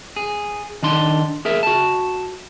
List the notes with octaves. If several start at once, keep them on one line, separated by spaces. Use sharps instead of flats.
G#4
D#3 D4 C6
G#4 A#4 E5
F#4 A5